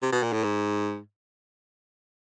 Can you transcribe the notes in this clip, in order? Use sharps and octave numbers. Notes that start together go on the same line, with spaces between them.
C3
B2
A#2
A2
G#2